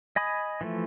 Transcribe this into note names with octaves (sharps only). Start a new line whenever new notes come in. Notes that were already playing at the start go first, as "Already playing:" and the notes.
D#5 G#5 B5 D#6
E3 F3 A3